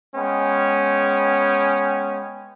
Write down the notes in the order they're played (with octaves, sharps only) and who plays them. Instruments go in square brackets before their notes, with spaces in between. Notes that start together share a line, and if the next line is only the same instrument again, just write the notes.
[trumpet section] G#3 B3 C#4 G5